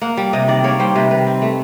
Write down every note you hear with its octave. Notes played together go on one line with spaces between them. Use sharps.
A#3 F#5
G3
C3 D#5
D#3 D5
A#3 C#5
G3 C5
C3 B4
D#3 B4
C4
A3